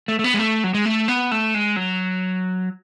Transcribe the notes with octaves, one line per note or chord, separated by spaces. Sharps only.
A3
A3
B3
G#3
A3
F#3
G#3
A3
B3
A3
G#3
F#3